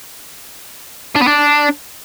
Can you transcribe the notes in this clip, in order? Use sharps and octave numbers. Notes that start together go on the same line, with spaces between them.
D4
B3
D4